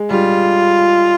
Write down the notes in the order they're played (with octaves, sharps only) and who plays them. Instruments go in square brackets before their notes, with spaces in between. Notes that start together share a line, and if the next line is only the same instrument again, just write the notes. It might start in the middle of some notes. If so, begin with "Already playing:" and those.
Already playing: [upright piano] G#3
[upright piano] G3 [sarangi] F4